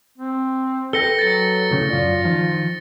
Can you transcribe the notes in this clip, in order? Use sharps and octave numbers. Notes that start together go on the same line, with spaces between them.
C4
A4 B4 G5 A#6 C#7 G7
F#3 A6 C#7
A2 C#3 C#4
F#2 F4 D5
D#3 F3